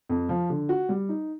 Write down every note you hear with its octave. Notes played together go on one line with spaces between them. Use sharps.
F2
F3
D3
F#4
G3
D#4